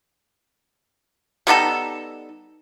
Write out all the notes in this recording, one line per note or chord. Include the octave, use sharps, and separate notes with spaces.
G3 B3 D#4 A4